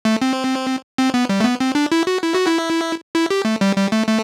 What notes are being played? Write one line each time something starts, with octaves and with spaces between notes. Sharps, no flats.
A3
C4
C4
B3
G3
A3
B3
C4
D4
E4
F#4
E4
F#4
E4
E4
G4
A3
G3
G3
A3
A3